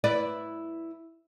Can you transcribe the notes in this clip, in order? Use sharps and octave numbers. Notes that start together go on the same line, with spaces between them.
E4 B4 D5